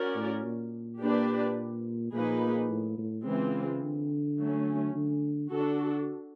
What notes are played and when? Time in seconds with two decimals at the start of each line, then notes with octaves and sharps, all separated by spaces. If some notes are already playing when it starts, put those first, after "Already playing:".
Already playing: C#4 F#4 A#4 D5
0.16 A2
0.44 A#2
1.01 A#3 D4 G4 B4 D5
2.13 A#2 F3 A#3 D#4 G#4 B4
2.69 A2
2.98 A2
3.26 C#3 E3 G#3 C4 F4
3.82 D3
4.39 F#3 A3 C#4
4.95 D3
5.52 D3 D4 F#4 A4